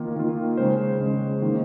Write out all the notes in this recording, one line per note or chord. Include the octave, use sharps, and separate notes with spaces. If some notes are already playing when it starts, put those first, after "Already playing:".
Already playing: D#3 A#3 F4
D#3 A#3 F4
C#3 G#3 C#4 C5
C#3 G#3 C#4
D#3 A#3